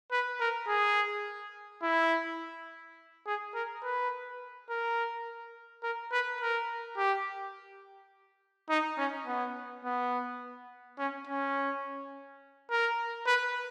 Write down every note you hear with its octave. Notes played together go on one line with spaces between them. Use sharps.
B4
A#4
G#4
E4
G#4
A#4
B4
A#4
A#4
B4
A#4
G4
D#4
C#4
B3
B3
C#4
C#4
A#4
B4